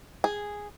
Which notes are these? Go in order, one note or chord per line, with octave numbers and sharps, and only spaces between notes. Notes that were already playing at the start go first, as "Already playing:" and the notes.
G#4